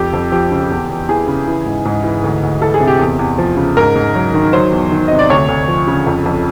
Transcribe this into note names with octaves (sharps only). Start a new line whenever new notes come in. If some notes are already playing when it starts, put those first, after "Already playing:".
Already playing: F2 G4
F2
F3 G4
C#3
E2
E2
E3 G#4
C#3
E3
G#2
G#2
E3
D2
D2
E3 A4
G#4
C3
G4
E2
E2
F3
C#3
G#2 A#4
G#2
F#3
D#3
F#3 C5
E2
D#3
C3 D#5
D5
D2 C#5
D2
F3
C#3
F2
F2